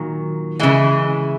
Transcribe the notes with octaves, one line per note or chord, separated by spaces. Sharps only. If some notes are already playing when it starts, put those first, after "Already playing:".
Already playing: A#2 D#3 F#3
C#3 E3 G#3 E4